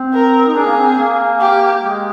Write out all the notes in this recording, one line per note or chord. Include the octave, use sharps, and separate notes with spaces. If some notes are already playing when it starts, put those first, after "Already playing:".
Already playing: C4
A#4
D#4
D4 G#4
A#3
C4
A#3
G4
G#3